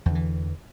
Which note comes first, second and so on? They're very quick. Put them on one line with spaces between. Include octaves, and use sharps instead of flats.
E2 D3 E3